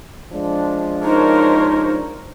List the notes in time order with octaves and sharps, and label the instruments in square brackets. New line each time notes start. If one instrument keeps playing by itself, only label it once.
[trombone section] F3 G#3 D4
[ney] D#4 [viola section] A#4 C5 C#5